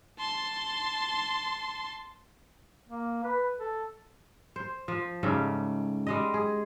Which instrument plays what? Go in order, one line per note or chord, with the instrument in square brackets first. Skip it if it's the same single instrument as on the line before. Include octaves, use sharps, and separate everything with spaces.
[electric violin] A5 C6
[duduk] A#3
B4
A4
[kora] C5
F3
G#2 C#3 G3 A3
G3 G#3 D#5
G#4